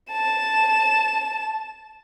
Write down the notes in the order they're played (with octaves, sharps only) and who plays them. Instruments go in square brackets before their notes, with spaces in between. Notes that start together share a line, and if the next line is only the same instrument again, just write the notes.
[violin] A5 E7